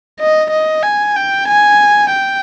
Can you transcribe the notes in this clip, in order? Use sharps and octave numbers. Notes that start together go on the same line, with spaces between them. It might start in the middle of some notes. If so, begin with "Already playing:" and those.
D#5
D#5
G#5
G5
G#5
G5